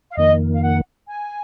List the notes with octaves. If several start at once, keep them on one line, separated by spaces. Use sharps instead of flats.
F5
F2 D#3 A#3 D#5
F5
F#5
G#5